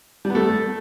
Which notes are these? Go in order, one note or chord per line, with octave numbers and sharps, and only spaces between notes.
G3
B3
A3